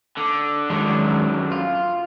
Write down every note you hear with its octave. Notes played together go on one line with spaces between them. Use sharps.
D3
F#2 D3 D#3 F#3 G#3
F4